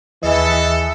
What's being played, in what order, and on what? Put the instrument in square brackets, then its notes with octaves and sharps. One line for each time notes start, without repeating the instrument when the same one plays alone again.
[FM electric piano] D#2 D#5 [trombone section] E3 [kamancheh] G#4 E5 [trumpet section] A4